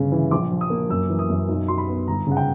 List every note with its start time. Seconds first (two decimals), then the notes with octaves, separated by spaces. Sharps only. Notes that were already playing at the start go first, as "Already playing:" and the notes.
Already playing: G1 C#3
0.12 E3
0.31 A#1 D6
0.51 F3
0.61 D#6
0.70 A#3
0.90 F#2 E6
1.10 E3
1.19 D#6
1.30 F#2
1.49 B1
1.68 F#3 C6
1.78 B5
1.88 B3
2.08 G1 A#5
2.27 C#3 F#5
2.37 G5